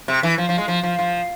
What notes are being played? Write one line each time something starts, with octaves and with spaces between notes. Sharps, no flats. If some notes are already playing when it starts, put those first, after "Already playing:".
C3
E3
F3
F3
G#3
F3
F3
F3